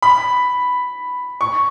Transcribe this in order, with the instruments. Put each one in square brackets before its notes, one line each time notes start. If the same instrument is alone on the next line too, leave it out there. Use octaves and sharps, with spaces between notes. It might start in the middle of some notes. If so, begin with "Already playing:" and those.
[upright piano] B5
C#6